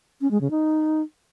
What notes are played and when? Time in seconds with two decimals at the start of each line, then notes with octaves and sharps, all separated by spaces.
0.21 C#4
0.31 G#3
0.41 C#3
0.51 D#4